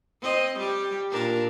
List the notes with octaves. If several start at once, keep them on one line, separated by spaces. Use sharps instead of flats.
C4 D#5
G3 G4
A#2 D4 A#4